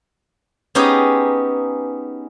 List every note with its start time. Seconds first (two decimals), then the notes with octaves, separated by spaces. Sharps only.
0.75 B3 C#4 D#4 G4 G#4